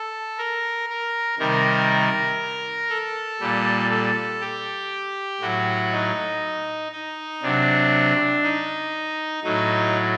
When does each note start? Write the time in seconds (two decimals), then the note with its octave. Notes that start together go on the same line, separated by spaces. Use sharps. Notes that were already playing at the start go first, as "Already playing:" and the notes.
Already playing: A4
0.38 A#4
0.89 A#4
1.39 C3 D#3 G3 A#4
2.89 A4
3.40 A#2 G3
3.90 A4
4.41 G4
5.41 A2 F#3 F#4
5.92 D#4
6.92 D#4
7.42 C3 F#3 D4
8.43 D#4
9.44 A2 F#3 D#4